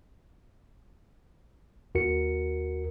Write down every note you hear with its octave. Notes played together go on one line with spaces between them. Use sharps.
D#2 F#4 A#4 C#7